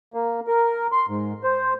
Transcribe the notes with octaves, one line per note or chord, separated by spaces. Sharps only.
A#3
A#4
C6
G#2
C5